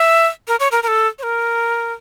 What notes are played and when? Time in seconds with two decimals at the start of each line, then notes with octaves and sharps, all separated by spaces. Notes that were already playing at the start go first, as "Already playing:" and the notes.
Already playing: E5
0.48 A#4
0.60 C#5
0.71 A#4
0.83 A#4
0.88 A4
1.19 C#5
1.23 A#4